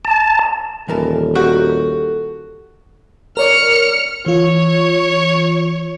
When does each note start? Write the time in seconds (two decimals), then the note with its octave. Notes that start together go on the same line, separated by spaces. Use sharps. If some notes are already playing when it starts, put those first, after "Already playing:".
0.05 A5
0.88 D#1 E3 A4 A#4 A5
1.35 F#4 G4 A#4
3.37 A#4 C#5 D5 F6 C#7
4.26 E3 F4 C#5